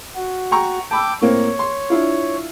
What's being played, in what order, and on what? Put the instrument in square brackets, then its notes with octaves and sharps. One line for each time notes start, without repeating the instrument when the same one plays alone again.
[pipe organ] F#4
[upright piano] G5 A#5 C#6
[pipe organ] G5 D6 [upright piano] A5 B5 E6
[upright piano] A2 A#3 C4 [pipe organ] C#5
[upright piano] C6
D4 E4 F4